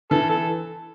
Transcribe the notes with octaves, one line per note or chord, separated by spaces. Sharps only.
E3 A4
A4